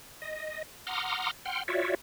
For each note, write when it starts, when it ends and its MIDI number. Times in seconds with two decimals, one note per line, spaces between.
0.22 0.62 75
0.87 1.31 78
0.87 1.31 82
0.87 1.31 84
0.87 1.31 86
0.87 1.31 87
0.87 1.31 89
1.46 1.63 78
1.46 1.63 79
1.46 1.63 84
1.46 1.63 89
1.68 1.95 65
1.68 1.95 66
1.68 1.95 73
1.68 1.95 74
1.68 1.95 76